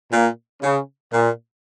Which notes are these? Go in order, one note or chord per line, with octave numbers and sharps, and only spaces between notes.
A#2
C#3
A#2